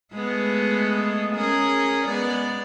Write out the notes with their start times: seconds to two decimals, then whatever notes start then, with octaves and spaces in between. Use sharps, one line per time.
0.13 G#3 A3 B3
1.36 C#4 G#4 A#4
2.06 G#3 B3 D5